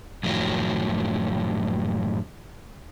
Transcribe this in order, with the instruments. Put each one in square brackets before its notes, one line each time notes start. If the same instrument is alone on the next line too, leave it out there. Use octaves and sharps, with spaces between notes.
[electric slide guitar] F#2 A2 D#3 F3 F#3